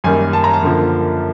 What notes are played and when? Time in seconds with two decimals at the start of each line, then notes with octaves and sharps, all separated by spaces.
0.04 F#2 D#3 G3 A#3 G#5
0.33 A5
0.44 A#5
0.54 A5
0.62 F#2 D3 F3 A#3